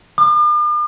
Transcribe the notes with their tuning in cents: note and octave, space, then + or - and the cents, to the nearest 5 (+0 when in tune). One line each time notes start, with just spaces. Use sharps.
D6 +45